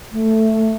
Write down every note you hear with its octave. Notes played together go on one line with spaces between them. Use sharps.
A3